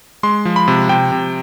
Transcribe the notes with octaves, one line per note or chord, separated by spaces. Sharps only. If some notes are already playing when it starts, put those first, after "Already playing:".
G#3 C6
F3
B5
C3
C3 G5
C3